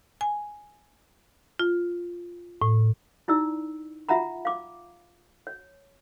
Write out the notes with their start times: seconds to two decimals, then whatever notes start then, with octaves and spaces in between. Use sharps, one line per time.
0.21 G#5
1.59 F4
2.62 A2
3.28 D#4 E4 D5 E6
4.09 F4 E5 F#5 A#5 B5
4.45 F5 D6
5.47 C#5